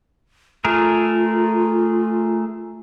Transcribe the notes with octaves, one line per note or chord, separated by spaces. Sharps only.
A3 F4 G#4 A#4